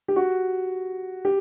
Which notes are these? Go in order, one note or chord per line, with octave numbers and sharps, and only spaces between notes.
G4
F#4
G4